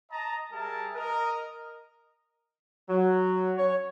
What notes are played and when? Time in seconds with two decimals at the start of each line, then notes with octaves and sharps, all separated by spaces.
0.11 D#5 A5 A#5
0.52 G3 G#4 A#4 E5 A5
0.95 A#4 D#5
2.90 F#3
3.57 C#5